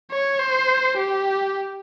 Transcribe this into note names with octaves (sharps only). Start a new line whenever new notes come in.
C#5
C5
G4